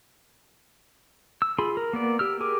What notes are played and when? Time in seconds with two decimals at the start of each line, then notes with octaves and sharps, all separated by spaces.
1.42 E6
1.58 F4 G#4 B5 C6
1.77 A#4
1.93 A#3 B3 D5
2.19 G4 E6 F6
2.40 G4 G#4 A#4 D6